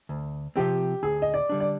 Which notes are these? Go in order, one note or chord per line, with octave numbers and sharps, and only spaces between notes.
D2
C3 F3 C4 G4
D2 G#4
D#5
D5
D3 G3 D4
D5